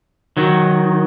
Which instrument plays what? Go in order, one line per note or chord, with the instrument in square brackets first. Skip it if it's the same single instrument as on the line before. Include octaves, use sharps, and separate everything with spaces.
[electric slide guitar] D#3 F#3